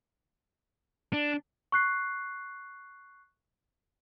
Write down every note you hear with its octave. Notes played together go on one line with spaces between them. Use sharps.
D4
C#6 F#6 C7